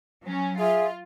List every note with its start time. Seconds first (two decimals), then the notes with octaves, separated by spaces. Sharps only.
0.24 F#3 C#4
0.59 F4 G#4 E5